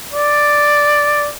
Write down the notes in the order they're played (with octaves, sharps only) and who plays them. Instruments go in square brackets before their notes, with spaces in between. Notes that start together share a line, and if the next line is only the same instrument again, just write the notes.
[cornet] D5